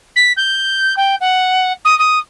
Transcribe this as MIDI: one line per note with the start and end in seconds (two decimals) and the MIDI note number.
0.16 0.33 95
0.37 0.94 91
0.97 1.15 79
1.21 1.73 78
1.85 1.97 87
1.99 2.19 87